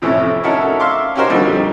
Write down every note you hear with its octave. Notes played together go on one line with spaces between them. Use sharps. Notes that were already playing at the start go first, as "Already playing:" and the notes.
F2 A2 C3 E3 C#4
C#4 D#4 E4 F#4 A4 A#4
E5 F5 C6 D6
C#4 D#4 F#4 G4 A#4 C5
F2 A#2 D3 G3 D4 D#4